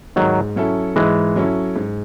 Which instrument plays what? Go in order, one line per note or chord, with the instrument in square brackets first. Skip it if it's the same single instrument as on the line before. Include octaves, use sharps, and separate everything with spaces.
[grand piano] G#2 [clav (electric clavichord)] D#3 F#3
[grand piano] F#3 C#4 E4 A4
[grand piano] G#2 [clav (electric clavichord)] E3 G#3
[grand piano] F#3 C#4 E4 A4
G#2